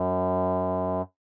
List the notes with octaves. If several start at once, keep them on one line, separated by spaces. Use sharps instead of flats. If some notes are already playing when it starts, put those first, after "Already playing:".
Already playing: F#2